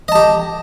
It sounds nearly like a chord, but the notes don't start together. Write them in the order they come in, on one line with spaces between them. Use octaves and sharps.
D#5 A5 G4